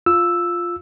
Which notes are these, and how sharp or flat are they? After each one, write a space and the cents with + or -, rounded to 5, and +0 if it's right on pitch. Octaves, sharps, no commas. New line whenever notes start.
F4 +0 E6 +0